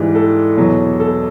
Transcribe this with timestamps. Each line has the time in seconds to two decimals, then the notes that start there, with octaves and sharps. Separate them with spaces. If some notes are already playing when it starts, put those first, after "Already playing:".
Already playing: G#2 E3 G3
0.15 A4
0.57 E2 B2 F#3
1.00 A4